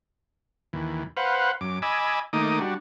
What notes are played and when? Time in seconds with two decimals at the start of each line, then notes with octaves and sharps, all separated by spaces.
0.73 D#2 E3
1.17 B4 C5 F5 F#5
1.61 F#2 D6
1.82 D#5 G#5 B5 D6 E6
2.33 D#3 A3 A#3 D#4 D6 D#6
2.60 G3 D4 F#4